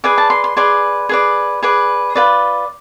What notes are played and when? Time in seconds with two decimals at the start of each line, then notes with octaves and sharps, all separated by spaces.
0.04 G#4 B4 D5 G#5
0.18 A5
0.30 C6
0.44 C6
0.57 G#4 B4 D5 C6
1.09 G#4 B4 D5
1.63 G#4 B4 D5
2.16 F4 B4 D5